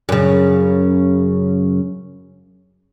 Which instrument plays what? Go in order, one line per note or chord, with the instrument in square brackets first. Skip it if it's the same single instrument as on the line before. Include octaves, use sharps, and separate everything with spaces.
[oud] F#2 C#3